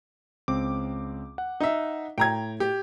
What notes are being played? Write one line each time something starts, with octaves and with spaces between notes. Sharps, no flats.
C#2 C4 D6
F#5
D#4 E5
A2 G5 A#5 G#6
G4